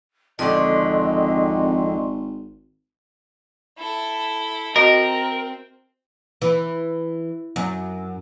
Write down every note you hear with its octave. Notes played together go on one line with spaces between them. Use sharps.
G#1 F2 D3 D5 D#5 C6 C#6
E4 A4
C4 F#4 A#4 D#5
E3
F#2